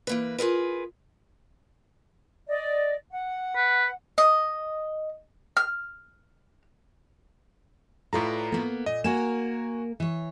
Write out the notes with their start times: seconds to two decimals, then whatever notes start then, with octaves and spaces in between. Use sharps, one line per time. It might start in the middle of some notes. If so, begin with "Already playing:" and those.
0.07 E3 A#3 B4
0.38 F4 G#4 A#4 B4
2.48 D5 D#5
3.11 F#5
3.56 B4
4.18 D#5
5.57 F6
8.13 A2 F4 A4 B4 D5 A#5
8.52 A#3 B3
8.86 A#2 D#5
9.04 A#3 F#4 A#4 G#5 E7
10.00 E3 C#5